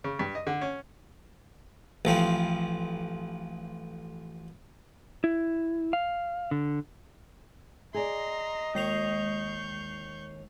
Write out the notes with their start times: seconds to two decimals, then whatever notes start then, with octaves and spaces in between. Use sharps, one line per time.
0.04 C#3
0.19 G2
0.35 D#5
0.47 D3
0.61 C#4
2.05 A1 F3 C4
5.24 E4
5.93 F5
6.51 D3
7.94 G#4 D5 D#5 A#5 C6
8.75 D#2 G#3 C#6 G6 C7 F7